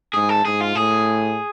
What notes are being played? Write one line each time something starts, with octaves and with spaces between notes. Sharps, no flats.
G#2 G#4
A4
G#2 G#4
F4
A2 G#4